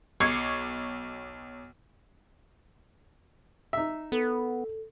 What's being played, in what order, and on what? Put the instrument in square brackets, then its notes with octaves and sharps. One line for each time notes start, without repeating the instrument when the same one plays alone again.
[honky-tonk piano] B1 C#6 D6 G#6 C7 C#7
[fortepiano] D#4 E5
[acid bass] B3 [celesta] A4